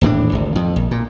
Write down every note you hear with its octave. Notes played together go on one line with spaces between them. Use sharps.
D#1 A2 E3 D4
G#1 D2
F2
A#1
A#2